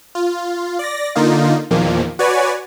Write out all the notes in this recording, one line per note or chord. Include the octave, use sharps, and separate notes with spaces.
F4
D5 A#6
D3 A#3 D#4 F4
E2 A#2 D#3 F3 A#3
F#4 B4 C#5 D5 G#5